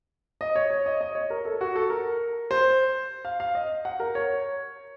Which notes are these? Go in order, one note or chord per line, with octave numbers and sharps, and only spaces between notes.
D#5
C#5
C#5
D#5
D#5
C#5
A#4
A4
F#4
A4
A#4
C5
F5
F5
D#5
F#5
A#4
C#5